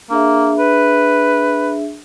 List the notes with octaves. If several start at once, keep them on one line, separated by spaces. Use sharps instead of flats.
A#3 D4 G#4 E5
B4